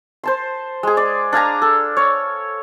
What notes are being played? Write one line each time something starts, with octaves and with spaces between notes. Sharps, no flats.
C5 A5 C6
G#3 G#4
D5
D4 F5 G#5 A#5
A4
C#5